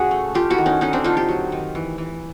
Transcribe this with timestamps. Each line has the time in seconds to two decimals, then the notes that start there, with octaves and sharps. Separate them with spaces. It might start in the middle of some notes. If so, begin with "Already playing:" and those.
Already playing: C#3 F#4 G#4
0.11 A3
0.35 A3 F4 G4
0.50 E4 F#4
0.58 D#3
0.66 C#4 D#4
0.81 D3 C#4 D#4
0.93 C4 D4
1.04 D3 D#4 F4
1.17 F4 G4
1.29 F#3
1.52 D#3
1.75 E3
1.98 E3